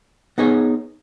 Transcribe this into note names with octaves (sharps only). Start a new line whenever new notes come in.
B3 D#4 G#4 C#5